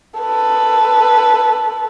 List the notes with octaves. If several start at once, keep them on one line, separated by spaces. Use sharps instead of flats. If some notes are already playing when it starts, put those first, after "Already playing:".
A4 B4